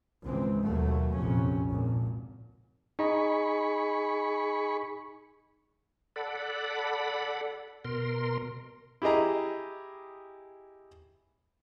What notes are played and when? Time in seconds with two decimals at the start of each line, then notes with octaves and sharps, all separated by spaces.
0.25 G#1 C#2 E3 G#3 C4
0.63 D#2 B2 F#3 A3 A#3
1.14 A#1 F2 C3 C#4
1.70 G#1 C#2 A#2
2.99 D#4 G#4 D#5 B5 C#6
6.16 A4 D5 F#5 B5
7.85 B2 A#4 C6
9.02 E4 G4 G#4 D#5 A#5